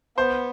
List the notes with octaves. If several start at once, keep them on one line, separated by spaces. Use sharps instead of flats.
B3 C5